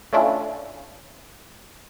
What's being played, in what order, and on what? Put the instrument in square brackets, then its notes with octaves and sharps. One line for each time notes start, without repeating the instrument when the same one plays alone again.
[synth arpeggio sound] A3 C#4 D4 E4 F4